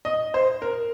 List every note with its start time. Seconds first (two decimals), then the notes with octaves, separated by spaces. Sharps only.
0.05 D#5
0.34 C5
0.62 A#4